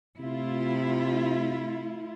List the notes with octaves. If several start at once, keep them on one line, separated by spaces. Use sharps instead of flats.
C3 A3 E4 F4